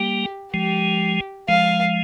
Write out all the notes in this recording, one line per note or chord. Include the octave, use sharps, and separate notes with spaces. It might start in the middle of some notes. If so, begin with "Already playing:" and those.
Already playing: G3 A#3 G4
F3 G#3 G4
F3 G#3 F5